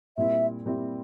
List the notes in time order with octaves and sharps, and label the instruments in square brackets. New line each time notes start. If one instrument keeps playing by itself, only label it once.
[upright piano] A#2 G3 C4 E4 [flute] E5
[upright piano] A#2 G3 C4 E4